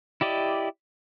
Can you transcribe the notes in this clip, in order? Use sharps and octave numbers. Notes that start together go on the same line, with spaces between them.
E4 G4 D5 D#5